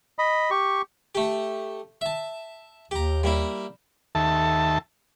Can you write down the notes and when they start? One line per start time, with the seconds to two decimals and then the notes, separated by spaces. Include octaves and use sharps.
0.19 D#5 B5
0.51 G4 C#6
1.15 A3 G4
2.01 E5 A5
2.91 D#2 G4 A#5
3.23 G3 A#3 E4
4.15 D#2 A4 E5 A5